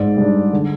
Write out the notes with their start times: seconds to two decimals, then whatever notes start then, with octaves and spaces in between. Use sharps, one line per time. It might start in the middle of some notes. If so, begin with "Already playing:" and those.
Already playing: G#2 D5
0.17 G3 D4
0.53 D3